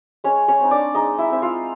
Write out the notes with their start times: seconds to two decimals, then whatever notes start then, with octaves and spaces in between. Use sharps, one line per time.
0.24 G#3 C#4 C#5
0.48 C#4 C#5
0.60 C4 D#4
0.71 D4 D5
0.94 G#3 D#4 D#5
1.18 E4 E5
1.30 C4 D#4 E5
1.42 F4 F5